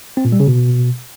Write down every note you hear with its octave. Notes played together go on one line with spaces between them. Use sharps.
C4
A#2
G3
C#3
B2